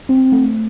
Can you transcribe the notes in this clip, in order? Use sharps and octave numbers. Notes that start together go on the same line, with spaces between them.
C4
A3